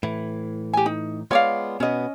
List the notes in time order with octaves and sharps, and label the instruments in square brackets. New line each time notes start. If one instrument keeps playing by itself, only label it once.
[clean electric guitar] A2 E3 [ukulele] E4
[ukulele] G4 G#5
D#4
[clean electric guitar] G#3 B3 F4 [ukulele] C#5 D5 F5
[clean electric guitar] B2 B3 [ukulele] C#4 D#5